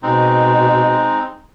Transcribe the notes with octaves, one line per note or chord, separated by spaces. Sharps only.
B2 G#3 C4 D#4